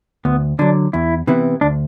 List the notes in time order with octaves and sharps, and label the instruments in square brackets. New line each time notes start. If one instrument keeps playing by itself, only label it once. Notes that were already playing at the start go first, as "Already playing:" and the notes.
[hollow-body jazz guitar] D2 [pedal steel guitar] B3
[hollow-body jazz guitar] D3 F#3 [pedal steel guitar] D4
[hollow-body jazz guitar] E2 [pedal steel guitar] E4
[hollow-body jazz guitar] C3 E3 B3 E4
[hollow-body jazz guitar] D2 [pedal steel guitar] D4